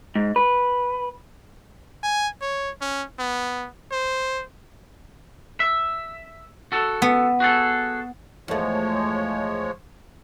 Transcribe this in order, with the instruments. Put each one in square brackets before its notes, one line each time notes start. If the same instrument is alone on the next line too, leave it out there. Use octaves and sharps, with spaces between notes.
[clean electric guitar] G#2
B4
[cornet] G#5
C#5
C#4
B3
C5
[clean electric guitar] E5
F#4 A4
[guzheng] B3
[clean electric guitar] F#4 G#4 A4
[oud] E2 A3 [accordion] F3 G#3 C#5